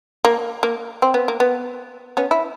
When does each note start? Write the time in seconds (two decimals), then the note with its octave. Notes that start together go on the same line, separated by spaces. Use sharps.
0.25 A#3
0.63 A#3
1.02 C4
1.14 B3
1.28 A#3
1.40 B3
2.17 B3 C#4
2.31 E4